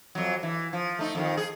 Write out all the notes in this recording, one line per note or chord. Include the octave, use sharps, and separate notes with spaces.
F2 F#3
E3
F3
A3 D#4
F2 D#3
G#4